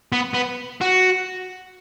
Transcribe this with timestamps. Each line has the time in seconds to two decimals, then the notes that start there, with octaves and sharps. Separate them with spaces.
0.12 B3
0.34 B3
0.81 F#4